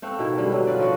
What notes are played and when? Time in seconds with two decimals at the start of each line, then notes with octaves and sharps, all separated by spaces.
0.02 A3 C4 F5 F#5
0.19 B2 D#3 E4
0.38 D3 G3 G#3
0.52 F#3
0.67 F4 B4 D5
0.80 F3 B3 F#4